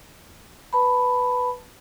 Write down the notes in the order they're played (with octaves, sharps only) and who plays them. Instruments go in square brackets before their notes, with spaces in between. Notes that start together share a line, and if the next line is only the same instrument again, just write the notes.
[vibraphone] B4 A5 B5